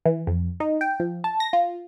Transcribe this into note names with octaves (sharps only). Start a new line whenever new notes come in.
E3
F2
D#4
G5
F3
A5
A#6
F4